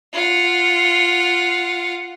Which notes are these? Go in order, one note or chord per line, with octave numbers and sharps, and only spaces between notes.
F4 F#5